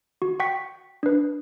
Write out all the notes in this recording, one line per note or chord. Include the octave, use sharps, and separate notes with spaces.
F#4
F#5 G5 C#6 B6
D4 B4